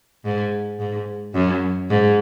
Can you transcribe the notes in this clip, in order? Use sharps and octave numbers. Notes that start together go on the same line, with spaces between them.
G#2
G#2
F#2
G#2